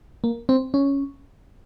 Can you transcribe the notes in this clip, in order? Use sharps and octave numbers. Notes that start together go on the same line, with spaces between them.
A#3
C4
C#4